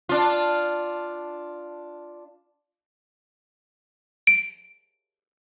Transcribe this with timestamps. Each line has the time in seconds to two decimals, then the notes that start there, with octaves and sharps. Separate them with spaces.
0.09 D4 F4
4.27 D7